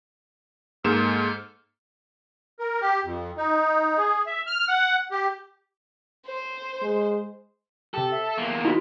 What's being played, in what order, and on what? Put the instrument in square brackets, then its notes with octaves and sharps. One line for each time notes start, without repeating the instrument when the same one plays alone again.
[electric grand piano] G#2 A#3 E7 [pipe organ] A4 F6 G6
[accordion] A#4
G4
F2
D#4
G#4
E5
F6
F#5
G4
[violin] C5
[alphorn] G#3
[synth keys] C3 G4 [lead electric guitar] A4
[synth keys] E5
[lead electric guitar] E2 A#3
[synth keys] D#4 [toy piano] E4 F#4